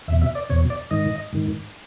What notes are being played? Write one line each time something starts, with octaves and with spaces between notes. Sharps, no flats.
E2 B2 E5
E5
D5
E2 B2 C#5
D5
G#2 D#3 D#5
G#2 D#3